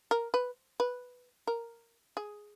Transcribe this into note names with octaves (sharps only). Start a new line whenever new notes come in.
A#4
B4
B4
A#4
G#4